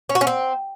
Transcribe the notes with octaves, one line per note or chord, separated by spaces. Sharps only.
C#4
F#4
C#4
C4